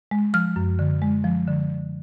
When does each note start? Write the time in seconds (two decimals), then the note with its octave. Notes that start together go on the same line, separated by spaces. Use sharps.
0.11 G#3
0.34 F3 F6
0.56 F#2
0.79 D3
1.02 G#3
1.24 F3
1.48 D3